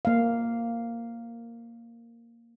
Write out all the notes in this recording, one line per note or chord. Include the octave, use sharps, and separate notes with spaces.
A#3 F5